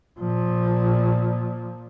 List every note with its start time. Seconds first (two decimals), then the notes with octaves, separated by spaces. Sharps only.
0.19 A#2 F3